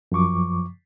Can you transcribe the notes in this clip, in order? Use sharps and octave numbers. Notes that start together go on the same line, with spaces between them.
F#2 F3 C#6 D6